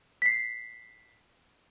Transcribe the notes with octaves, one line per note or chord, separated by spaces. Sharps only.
B6 C7